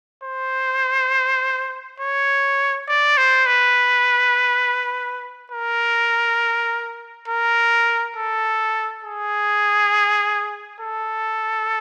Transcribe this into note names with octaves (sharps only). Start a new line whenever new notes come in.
C5
C#5
D5
C5
B4
A#4
A#4
A4
G#4
A4